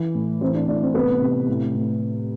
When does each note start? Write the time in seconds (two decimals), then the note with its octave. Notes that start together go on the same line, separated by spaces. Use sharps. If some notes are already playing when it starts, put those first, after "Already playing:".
Already playing: E3
0.15 A2
0.41 E3 C4 C5
0.55 D4 D5
0.68 A2 D4 D5
0.81 C4 C5
0.94 C3 B3 B4
1.21 C3
1.48 A2
1.74 A2